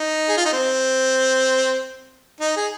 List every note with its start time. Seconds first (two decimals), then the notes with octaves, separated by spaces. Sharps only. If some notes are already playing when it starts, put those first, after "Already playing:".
Already playing: D#4
0.29 G#4
0.37 F4
0.46 D#4
0.53 C4
2.40 D#4
2.56 G#4